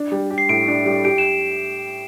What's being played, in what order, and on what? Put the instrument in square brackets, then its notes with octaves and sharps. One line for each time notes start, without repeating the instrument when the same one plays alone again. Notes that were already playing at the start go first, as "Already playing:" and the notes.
Already playing: [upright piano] D4
G3
G4
[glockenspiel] C7
[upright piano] A2 [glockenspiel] D7
[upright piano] D4
G3
[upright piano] G4 [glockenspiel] D7
[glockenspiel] E7